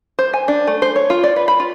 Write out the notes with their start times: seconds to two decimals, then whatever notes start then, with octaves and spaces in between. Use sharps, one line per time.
0.19 C5
0.33 G#5
0.48 D4
0.67 A3
0.82 C5
0.96 C#5
1.10 F4
1.24 D5
1.36 B4
1.48 B5
1.60 F4